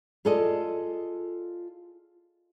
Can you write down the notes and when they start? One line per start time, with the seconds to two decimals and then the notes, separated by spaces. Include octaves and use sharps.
0.25 F4 G#4 A4 D5 D#5